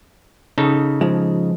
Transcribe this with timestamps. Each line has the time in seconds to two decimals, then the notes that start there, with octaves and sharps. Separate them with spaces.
0.58 C#3 D#4 A4
1.01 F3 G#3